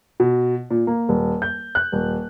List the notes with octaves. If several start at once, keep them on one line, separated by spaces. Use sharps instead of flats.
B2
A#2
A#3
D#1
G6
F#6
D#1